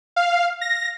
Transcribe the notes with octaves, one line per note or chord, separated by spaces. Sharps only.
F5
A#6